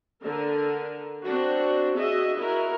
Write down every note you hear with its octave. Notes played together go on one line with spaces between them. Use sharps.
D3 A#4
C4 D4 F#4
F#4 G#4 D#5 E5
E4 F#4 A#4